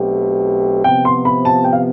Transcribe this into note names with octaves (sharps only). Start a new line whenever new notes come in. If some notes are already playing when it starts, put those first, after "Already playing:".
Already playing: B1 B2 A3 C4 G4
C3 F3 B3 G5
C6
B5
A5
G5
F5